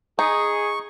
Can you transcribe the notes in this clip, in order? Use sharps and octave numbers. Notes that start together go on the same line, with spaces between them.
D#4 G#4 C#6